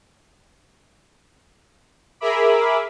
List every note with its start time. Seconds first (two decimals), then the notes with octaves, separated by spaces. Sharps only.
2.20 G#4 A#4 E5 B5 D6